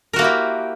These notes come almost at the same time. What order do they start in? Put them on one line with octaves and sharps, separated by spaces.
A#4 F#4 A#3 E4 G4